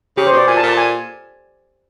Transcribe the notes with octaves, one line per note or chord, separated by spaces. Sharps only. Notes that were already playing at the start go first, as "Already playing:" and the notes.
C#3 G4
C5
B2 D5
A#2 G#5
A5
A#2
A5
G#5